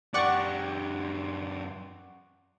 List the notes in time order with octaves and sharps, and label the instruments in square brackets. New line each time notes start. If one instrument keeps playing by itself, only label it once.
[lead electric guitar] F#2 G4 [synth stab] D5 F#5 C#6